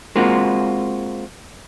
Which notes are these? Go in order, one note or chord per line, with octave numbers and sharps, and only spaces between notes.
G#3 A#3 C4 F4 F#4